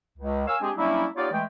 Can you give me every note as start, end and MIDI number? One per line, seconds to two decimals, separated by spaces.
0.18 0.46 37
0.47 0.55 70
0.47 0.55 73
0.47 0.55 77
0.47 0.55 80
0.47 0.55 88
0.61 0.71 56
0.61 0.71 60
0.61 0.71 62
0.61 0.71 67
0.61 0.71 68
0.76 1.05 54
0.76 1.05 55
0.76 1.05 58
0.76 1.05 61
0.76 1.05 62
0.76 1.05 64
1.16 1.29 59
1.16 1.29 63
1.16 1.29 65
1.16 1.29 67
1.16 1.29 73
1.16 1.29 74
1.32 1.42 52
1.32 1.42 56
1.32 1.42 57
1.32 1.42 79